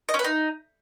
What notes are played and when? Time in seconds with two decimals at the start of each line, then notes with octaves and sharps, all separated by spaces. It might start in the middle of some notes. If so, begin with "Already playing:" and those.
0.09 D#5
0.14 C#4
0.19 B4
0.24 D#4